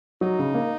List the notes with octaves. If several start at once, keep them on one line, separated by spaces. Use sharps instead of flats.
F#3 D#4
C#3
A#3